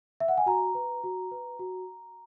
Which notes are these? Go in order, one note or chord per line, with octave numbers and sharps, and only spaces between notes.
E5
F#5
G#5
F#4 A#5
B4
F#4
B4
F#4